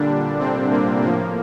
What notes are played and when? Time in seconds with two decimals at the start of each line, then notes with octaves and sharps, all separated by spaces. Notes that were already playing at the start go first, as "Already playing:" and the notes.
Already playing: A#2 D3 G3 D4
0.39 C3 C4
0.70 A#3
1.02 A2 F3 A#3